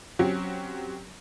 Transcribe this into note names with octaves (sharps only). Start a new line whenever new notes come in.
F#3 C4 C#4 F#4 G4